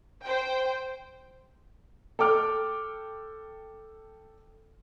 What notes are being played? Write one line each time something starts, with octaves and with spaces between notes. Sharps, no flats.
C5 G5
A4 G5 D6 F6